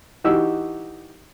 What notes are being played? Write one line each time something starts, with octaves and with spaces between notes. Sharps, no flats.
E3 D#4 F#4 G4 E6